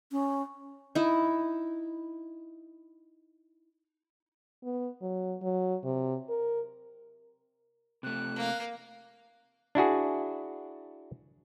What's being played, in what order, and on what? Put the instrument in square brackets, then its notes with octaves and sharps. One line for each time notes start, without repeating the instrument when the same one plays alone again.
[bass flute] C#4
[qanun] D#4 E4
[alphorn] B3
F#3
F#3
C3
A#4
[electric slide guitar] C3 A3 [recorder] F#6
[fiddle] A#3 F5
[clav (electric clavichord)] D4 E4 F#4 G#4